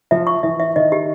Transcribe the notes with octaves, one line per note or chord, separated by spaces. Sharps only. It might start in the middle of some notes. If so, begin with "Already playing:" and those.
F3 E5
C#6
E3 E5
E5
D#3 D#5
G4